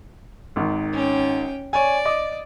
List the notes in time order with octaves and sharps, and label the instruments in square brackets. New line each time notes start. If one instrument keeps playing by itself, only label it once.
[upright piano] G#1 D#3
[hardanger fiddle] C#4 G5
[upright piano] C#5 G#5 [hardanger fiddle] D5
[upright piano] D#5 D6